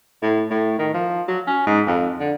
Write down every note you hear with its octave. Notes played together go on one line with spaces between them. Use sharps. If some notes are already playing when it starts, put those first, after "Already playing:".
A2
A2
D#3
F3
F#3
C#4
G#2
F2
D3